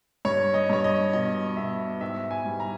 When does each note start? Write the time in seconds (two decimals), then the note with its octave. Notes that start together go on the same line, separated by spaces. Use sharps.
0.25 G2 C#5
0.54 D#5
0.69 G2 C#5
0.84 D#5
1.13 B2 D#5
1.57 B2 E5
2.01 G#2 E5
2.31 G#5
2.45 G3
2.60 A#5